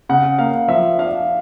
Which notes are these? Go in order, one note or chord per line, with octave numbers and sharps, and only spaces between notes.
C#3 F#5
A#3 F5
F3 E5
D4 F5